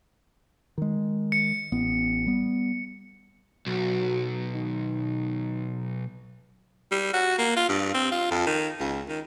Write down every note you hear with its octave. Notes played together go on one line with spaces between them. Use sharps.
D#3 G#3
C#7
A1 B3
G3 B3
B1 F#3
D#3
G3
F#4
A#3
F4
G2
C4
F4
F2
D#3
C#2
D#3